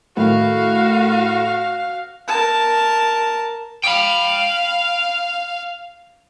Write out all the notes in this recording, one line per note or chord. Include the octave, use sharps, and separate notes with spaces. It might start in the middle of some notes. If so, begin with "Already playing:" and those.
A2 D#3 F#4 F5
A#4 A5
F5 G5 B5